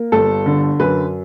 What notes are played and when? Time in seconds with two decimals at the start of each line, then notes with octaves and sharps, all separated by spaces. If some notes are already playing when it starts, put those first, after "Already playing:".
Already playing: A#3
0.12 G1 A4
0.46 D3
0.79 F#2 B4